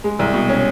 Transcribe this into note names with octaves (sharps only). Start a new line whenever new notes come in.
G#3
C2
B2
C#4